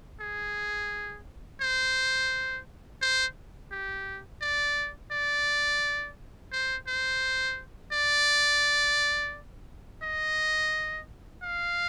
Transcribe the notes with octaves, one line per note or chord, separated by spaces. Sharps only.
G#4
C5
C5
G4
D5
D5
C5
C5
D5
D#5
F5